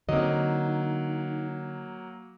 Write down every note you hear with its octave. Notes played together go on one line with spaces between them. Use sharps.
D3 F#3 A#3 C4 D#4 D#5